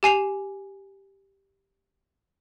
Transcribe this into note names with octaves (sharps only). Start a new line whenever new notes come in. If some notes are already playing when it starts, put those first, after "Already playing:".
G4 G#5 C7 F7